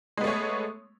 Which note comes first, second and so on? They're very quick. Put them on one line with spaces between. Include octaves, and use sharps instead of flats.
G#3 B3 A3 C#5